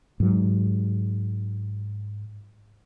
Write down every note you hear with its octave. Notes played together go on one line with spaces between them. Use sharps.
G#2 F#3